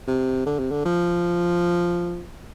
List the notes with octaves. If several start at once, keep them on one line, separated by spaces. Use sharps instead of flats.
C3
D3
C3
D3
F3